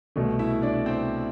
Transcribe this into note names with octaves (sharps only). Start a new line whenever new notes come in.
C2 B2 A3
E4 E5
D4 D5
C4 C5